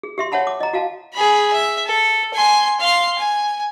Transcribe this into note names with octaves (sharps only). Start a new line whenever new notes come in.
G#4
G4 E5 C6
C#5 E5 F#5 A5 B5
D6
D#5 A#5
F#4 F5 A5
G#4 B5
E5
A4
G#5 C6
F5 C6
G#5